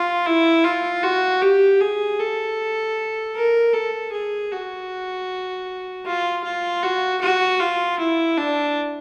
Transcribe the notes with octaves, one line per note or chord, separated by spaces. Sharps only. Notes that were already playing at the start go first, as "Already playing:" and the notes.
Already playing: F4
E4
F4
F#4
G4
G#4
A4
A#4
A4
G#4
F#4
F4
F4
F#4
F#4
F4
E4
D4